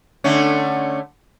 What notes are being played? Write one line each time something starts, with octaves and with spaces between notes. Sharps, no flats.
D3 A3 C#4